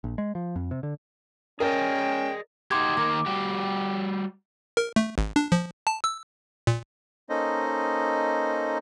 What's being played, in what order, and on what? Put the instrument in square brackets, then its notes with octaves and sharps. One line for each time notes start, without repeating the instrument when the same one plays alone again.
[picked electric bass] A#1
G#3
F3
F2
C3
D3
[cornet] C#4 [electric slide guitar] G#4 D5 D#5 [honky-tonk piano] A#4 [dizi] G5
[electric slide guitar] D#4 F#4 G4 [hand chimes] C6 D6 G#6
[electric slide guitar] D#3 A#3 A#4 [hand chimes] D6
[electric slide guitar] G3 F#4 G4
[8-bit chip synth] A#4
A3
G#1
D4
F3
A5
E6
A#2
[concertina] A#3 C#4 D#4 A4 C5 D#5